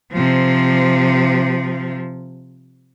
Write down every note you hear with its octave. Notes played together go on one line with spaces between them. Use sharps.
C3 F3